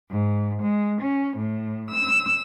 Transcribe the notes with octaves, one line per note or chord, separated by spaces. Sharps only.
G#2
G#3
C#4
A2
E6